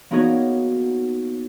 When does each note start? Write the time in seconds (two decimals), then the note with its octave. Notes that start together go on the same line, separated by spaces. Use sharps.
0.11 A#3 B3 D#4 F#4 A#4 C#5